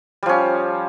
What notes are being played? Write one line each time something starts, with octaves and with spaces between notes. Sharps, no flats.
F3 G3 C#4